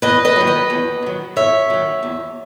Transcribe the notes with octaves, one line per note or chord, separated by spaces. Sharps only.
E2 B4 D#5
B4 D#5
D#3 F#3
B4 D#5
E2
D#3 F#3
E2 C#5 E5
D#3 F#3
E2